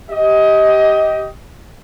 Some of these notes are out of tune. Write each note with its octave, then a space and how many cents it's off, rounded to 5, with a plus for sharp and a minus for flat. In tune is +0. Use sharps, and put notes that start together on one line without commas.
G4 -5 D#5 +20